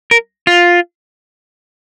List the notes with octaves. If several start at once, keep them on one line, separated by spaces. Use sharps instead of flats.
A#4
F4